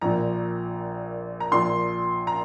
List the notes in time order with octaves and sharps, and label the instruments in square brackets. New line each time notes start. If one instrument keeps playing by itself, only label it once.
[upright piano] A#1 A#2 A#5
A#5
A#1 A#2 C6
A#5